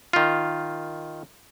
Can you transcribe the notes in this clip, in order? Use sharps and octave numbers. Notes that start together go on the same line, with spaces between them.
D#3 F4